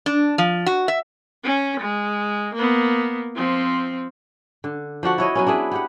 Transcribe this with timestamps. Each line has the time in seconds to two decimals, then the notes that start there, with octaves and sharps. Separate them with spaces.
0.06 D4
0.38 F3
0.66 F#4
0.88 E5
1.44 C#4
1.80 G#3
2.54 A#3 B3
3.36 F3 C4
4.64 D3
5.03 F3 D4 F#4 F#5
5.18 E4 C#5 D#5
5.35 F#3 B3 C#4
5.47 D4 E4 G#4 B4
5.71 B3 G4 F#5